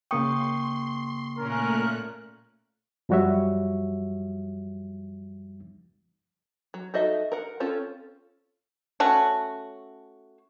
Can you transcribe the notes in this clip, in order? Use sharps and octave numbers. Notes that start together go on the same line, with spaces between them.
C#3 A#3 G5 C6 C#6 D#6 C#7
A#2 A3 C#4 A#4 F#6
F#2 F3 G3 F#4 C#5 E5
F#3
D#4 F#4 A4 D#5 E5
A#4 F#5
C4 C#4 F4 A4
A3 C#4 F#4